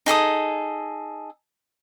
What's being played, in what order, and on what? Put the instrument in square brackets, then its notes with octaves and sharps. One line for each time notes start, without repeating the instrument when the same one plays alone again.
[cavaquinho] D#4 G#4 A4 D#6